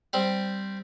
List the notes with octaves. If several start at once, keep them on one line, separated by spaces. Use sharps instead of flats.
G3 C4